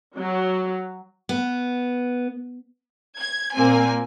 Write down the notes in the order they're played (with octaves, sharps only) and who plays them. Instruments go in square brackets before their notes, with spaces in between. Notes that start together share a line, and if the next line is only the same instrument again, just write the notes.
[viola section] F#3
[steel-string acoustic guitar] B3
[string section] G#6
A#2 A#3 C4 G#5